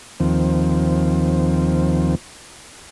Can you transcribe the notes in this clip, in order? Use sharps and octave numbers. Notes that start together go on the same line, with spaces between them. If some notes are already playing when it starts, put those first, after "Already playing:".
D#2 F3 C4